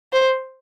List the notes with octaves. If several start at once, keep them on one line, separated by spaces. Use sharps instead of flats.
C5